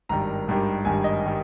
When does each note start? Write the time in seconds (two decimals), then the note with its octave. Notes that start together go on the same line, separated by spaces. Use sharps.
0.09 G#1 G2 D#3 G3 A#5
0.47 G#1 G2 D#3 G3
0.85 G#1 G2 D#3 G3 G#5
1.04 D#5
1.26 D#3 G3